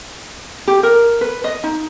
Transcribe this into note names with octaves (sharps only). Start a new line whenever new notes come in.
G4
A#4
B4
D#5
D#4